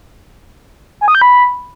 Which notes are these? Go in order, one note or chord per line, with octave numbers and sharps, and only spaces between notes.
G#5
D#6
G6
B5